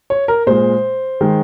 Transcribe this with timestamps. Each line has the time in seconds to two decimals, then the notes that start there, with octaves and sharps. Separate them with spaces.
0.10 C#5
0.28 A#4
0.47 A#2 G#3 C5
1.21 D#3 G#3